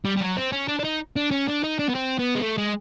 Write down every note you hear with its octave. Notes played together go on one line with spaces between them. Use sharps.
G3
G3
F#3
C4
C#4
D4
D4
D#4
D4
C#4
D4
D#4
D4
B3
C4
B3
G#3
A3
G#3